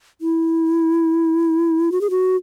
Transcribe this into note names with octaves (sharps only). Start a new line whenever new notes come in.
E4
F#4
G#4
F#4